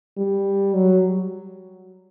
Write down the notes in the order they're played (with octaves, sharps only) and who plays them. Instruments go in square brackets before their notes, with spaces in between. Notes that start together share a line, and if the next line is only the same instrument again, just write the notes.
[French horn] G3
F#3